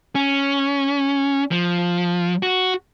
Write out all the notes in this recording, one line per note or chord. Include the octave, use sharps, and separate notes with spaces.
C#4
F3
F#4